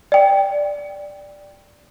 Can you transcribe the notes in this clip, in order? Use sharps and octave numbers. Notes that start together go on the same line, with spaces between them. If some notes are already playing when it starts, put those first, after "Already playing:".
D5 G5